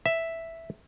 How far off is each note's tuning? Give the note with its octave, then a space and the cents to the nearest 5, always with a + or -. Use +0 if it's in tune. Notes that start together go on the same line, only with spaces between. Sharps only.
E5 +0